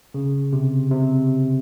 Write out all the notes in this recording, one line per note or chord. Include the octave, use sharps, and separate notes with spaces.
C#3
C3
C3